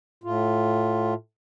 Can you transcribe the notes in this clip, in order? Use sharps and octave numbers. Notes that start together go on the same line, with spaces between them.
A2 F4